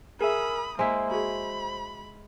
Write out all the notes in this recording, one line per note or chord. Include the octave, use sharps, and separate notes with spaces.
G#4 A#4 E5 G#5 B5 D#6 E6
G#3 A#3 E4 C5
F#4 G#4 B5